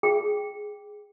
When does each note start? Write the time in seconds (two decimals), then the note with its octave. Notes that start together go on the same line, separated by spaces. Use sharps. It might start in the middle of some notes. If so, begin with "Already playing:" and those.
0.03 G#4 G5